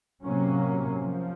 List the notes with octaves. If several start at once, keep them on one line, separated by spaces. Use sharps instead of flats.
C3 F#3 A#3 C#4
F3